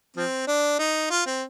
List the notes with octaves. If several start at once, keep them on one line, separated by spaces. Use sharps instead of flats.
F3 C4
D4
D#4
F4
C4